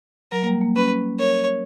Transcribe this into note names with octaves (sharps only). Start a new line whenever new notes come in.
F#3 A#4
A#3
G3
A#3
C#4 B4
A#4 C#5